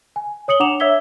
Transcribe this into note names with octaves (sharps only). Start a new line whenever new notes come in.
G#5
C#5 D#6 C#7 F#7 G7
D4 F#5 A#5 D6 E7 F7
C#5 E5 E6 G#6 B6 G7